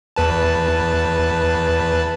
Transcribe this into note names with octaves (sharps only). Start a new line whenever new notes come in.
E2 B4 A5